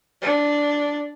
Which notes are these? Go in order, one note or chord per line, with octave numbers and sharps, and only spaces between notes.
D4